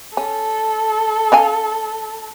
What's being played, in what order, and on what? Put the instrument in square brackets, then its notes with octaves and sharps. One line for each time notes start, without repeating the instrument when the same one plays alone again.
[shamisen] C#4 [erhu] A4
[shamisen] C#4 F5 G#5